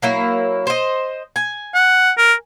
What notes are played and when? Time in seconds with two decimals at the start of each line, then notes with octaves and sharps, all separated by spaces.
0.02 F#3 A#3 E4
0.67 C5 D#5
1.36 G#5
1.75 F#5
2.18 A#4